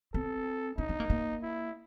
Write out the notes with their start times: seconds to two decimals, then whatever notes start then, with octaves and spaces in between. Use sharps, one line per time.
0.14 C4 A4
0.78 D4 D#4
0.89 D4
1.00 A#3
1.10 A#3
1.43 E4